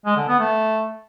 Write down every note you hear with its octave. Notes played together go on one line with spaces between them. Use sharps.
G#3
D3
B3
A3